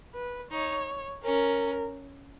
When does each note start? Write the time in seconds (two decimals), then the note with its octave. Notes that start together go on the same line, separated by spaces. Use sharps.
0.15 B4
0.51 D#4 C#5
1.24 C#4 A#4